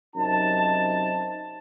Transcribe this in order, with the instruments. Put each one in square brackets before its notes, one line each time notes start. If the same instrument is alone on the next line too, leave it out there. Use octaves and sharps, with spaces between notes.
[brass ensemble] F#2 C3 D#4 A5